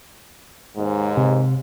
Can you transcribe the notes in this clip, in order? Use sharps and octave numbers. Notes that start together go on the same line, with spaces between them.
D#2 G#2
C3